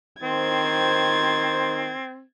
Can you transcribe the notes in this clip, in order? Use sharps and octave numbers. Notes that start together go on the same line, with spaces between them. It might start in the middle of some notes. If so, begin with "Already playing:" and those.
D#3 C4 C5 G#6 A6